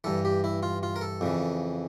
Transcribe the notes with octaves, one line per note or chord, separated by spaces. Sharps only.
G2 E3 A4
G4
E4
F4
F4
A#4
A4
F2 C#3 E3